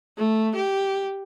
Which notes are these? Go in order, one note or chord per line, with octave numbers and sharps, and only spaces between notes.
A3
G4